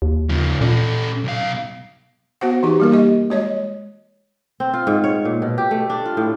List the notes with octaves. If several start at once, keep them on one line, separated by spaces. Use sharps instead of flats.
D#2
C#3 F3
A#2 C#4 A4
B1 F5
B3 F#4 C5 F#5
E3 D#4 G4
G3 A#3 A#4
G4 D#5
G#3 C#5 D#5
C4
F4
G#2
C#5
A#2
B2
G4
A3
D4
F4
A2